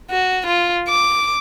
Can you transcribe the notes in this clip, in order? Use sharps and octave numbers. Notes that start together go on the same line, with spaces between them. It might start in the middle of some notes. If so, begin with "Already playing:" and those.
F#4
F4
D6